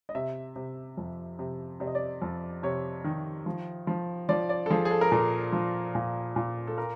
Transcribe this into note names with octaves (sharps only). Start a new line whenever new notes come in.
D#5
C3 E5
C3
F2
C3
C3 D5
D#5
D5
F2
C3 C#5
D#3
F3
F3
F3 D5
D5
A4
F3 G#4
G#4
A4
A#4
A#2 A4
F3
A#2
A#2
A4
A#4